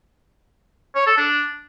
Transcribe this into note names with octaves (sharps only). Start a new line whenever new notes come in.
C#5
A4
D4